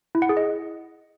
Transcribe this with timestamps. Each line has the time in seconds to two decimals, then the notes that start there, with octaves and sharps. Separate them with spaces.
0.15 E4
0.22 F#5
0.29 G#4
0.37 D#5